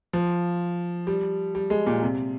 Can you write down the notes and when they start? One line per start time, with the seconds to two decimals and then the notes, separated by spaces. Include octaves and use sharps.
0.13 F3
1.07 G3
1.55 G3
1.70 G#3
1.87 A#2
2.03 C3